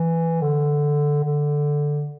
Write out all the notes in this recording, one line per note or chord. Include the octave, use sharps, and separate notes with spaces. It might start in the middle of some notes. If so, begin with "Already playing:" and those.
Already playing: E3
D3
D3